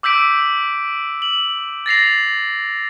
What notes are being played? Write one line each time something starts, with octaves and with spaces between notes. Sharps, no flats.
D6 E6 G6 B6 D7
F#7
A6 A#6 C7 F7